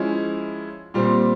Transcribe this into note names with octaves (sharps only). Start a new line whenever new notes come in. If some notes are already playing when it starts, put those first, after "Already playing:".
Already playing: F3 G#3 C#4 E4
A#2 G3 C4